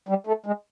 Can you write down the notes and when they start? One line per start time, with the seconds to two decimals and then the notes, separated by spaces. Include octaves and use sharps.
0.09 G3
0.27 A3
0.46 G#3